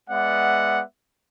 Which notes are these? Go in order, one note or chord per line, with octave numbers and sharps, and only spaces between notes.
G#3 B3 D5 E5 F#5